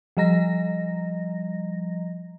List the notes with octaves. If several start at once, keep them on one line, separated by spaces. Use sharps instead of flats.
F3 G3 D#5 A#5 A#6